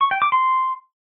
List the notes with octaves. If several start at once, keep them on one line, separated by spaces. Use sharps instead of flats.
C#6
G5
D6
C6